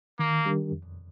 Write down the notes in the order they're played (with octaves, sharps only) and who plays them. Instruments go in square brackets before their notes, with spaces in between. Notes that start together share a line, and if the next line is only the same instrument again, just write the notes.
[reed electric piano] D#3 [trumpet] A#3
[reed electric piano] G3 D4 G4 A#4
F2